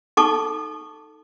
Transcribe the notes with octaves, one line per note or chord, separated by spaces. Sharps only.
D#4 A4 A5 C#6 D6